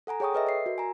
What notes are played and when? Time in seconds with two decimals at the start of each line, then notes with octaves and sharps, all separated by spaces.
0.07 A4 F#5 G#5 A#5
0.20 G#4 C#5 G5 C#6 D#6
0.33 A4 B4 D#5 E5
0.47 D5 C7
0.66 F#4 A#4
0.78 G#5 A#5